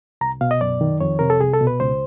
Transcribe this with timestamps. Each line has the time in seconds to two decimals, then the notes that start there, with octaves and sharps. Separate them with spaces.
0.21 C2 A#5
0.41 B2 F5
0.51 D#5
0.61 F#2 D5
0.81 D#3
1.01 F2 C#5
1.19 C3 A#4
1.30 A4
1.40 C2 G#4
1.54 A4
1.61 B2
1.67 B4
1.80 C#2 C5